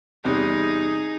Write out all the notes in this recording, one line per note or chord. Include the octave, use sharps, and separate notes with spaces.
E2 C3 G3 D#4 G#4